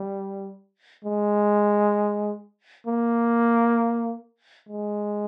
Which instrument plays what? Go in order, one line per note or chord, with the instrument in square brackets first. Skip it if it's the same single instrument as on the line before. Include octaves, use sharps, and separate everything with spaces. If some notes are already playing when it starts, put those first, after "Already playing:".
Already playing: [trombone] G3
G#3
A#3
G#3